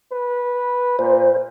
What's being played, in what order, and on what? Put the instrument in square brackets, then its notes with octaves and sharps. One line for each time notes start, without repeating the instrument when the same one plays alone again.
[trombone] B4
[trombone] A#2 [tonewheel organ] C5